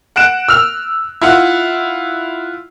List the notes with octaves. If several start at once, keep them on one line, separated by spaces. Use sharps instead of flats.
F#5 F#6 D7 E7
E6 F6 F7
E4 F4 F#5